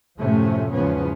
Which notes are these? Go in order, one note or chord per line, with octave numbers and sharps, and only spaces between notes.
F#2 A2 C3 F3 A3 C#4
E2 G#2 C#3 F3 B3 C#4